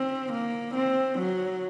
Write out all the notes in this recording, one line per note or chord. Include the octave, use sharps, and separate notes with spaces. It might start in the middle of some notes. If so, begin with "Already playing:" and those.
Already playing: C4
A#3
C4
F#3